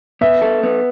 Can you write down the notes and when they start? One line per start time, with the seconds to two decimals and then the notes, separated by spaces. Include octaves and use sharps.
0.21 B3 E5
0.42 A4
0.63 B3